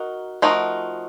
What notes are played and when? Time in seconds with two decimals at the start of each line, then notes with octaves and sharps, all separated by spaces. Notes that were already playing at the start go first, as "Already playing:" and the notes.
Already playing: D#4 F#4 A#4
0.42 F3 A3 D#4 F#4 A#4